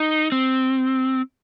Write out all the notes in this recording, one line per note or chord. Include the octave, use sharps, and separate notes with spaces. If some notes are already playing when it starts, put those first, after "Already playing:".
Already playing: D#4
C4